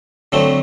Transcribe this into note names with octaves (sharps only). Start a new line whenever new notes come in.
D3 F#3 A3 C4